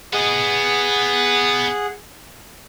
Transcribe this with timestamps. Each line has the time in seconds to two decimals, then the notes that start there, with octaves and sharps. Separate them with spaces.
0.13 B3 G#4 D#5 F#5